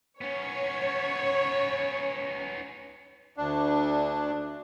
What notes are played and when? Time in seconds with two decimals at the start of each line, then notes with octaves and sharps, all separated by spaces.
0.21 B3 C#4 C#5
3.37 D2 D4